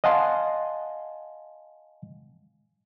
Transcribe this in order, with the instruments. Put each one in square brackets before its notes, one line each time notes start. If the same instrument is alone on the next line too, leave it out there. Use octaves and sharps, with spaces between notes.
[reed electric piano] D#5 F5 F#5 G#5 A5 C6